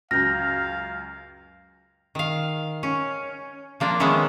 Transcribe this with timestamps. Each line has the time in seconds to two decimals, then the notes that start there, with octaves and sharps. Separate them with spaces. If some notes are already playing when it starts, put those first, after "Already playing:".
0.11 C#2 F#2 F5 F6 G6 A#6
2.15 D#3 F5
2.83 C#4
3.80 F3 A#3 D4 F4
4.00 D#3 E3 G#3 B3 C#4 E4